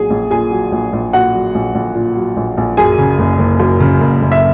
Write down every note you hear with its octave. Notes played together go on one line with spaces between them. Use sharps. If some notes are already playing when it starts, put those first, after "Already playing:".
Already playing: A#1 A#2 F#3 G#4 G#5
A#1
A#2 G#4 G#5
F#3
A#1
A#1
A#2 F#4 F#5
F#3
A#1
A#1
A#2
F#3
A#1
A#1
F#2 G#4 G#5
C#3
F#1
F#1
F#2
C#3
F#1
F#1
E5